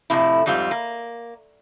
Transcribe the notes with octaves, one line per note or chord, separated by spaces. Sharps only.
F2 A2 C3 E4
F2 G#2 G3 C4 F4
A#3